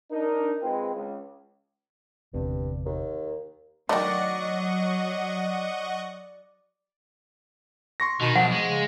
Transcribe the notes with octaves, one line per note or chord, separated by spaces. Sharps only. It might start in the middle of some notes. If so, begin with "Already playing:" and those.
D4 D#4 A#4
G#3 C4 F4 B4 G5
C#2
G1 E2 G2 C3
D#2
D#3 F#3 A3 D5 D#5 F#5 C#6
C6 C#6 A#6
B2 D#3
B1 F3 F#5
G#3
C#3